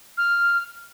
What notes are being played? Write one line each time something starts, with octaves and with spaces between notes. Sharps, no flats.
F6